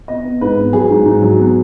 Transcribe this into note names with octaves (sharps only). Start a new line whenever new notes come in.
B3 D#5
B3
G#2 B4
B3
F#3 G#4
G#2
G#2
F#3
B3